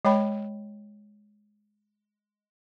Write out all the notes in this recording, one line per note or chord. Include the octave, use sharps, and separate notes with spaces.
G#3 C#5 G5 B5